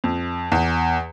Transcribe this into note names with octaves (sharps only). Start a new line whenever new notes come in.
F2
E2